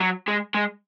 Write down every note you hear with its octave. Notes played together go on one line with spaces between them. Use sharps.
F#3
G#3
G#3